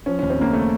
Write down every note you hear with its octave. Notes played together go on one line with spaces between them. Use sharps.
F3 C#4
D#2 C#4
C4
C#3 A#3
A3